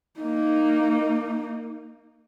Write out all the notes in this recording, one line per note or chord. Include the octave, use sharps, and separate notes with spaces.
A#3 D#4